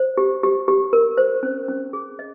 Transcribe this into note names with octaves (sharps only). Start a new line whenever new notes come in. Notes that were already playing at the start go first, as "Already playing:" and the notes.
Already playing: C5
G4
G4
G4
A#4
C5
C#4
C#4
G#4
D#5